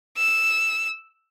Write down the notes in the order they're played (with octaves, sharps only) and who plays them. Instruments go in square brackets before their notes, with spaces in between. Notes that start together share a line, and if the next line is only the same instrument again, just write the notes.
[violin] E6